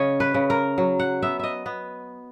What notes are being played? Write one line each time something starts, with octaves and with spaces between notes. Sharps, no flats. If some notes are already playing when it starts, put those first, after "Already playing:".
Already playing: C#3 C#5 D#5
B4
C#3
A#4
F#3
F#5
B3 E5
D#5 E5
B3